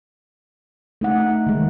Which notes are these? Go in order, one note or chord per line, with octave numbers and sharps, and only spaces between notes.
A3 D#4 F#5
D#3 G#3